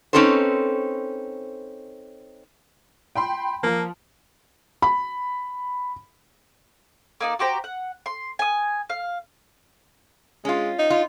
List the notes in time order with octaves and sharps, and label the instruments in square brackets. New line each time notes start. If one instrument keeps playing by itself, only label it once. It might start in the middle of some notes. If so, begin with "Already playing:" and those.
[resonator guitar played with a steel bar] C4 C#4 D#4 A4 B4 C5
[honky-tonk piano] G5 B5 C6
[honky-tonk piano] F3 [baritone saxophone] A#3
[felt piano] B5
[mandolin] A#3 D#4 D5
F#4 G4 C5 A#5
F#5
C6
G#5 D#6
F5
[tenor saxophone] G#3 [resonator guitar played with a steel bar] C#4 F4
[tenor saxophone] D#4
[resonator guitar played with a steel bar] F4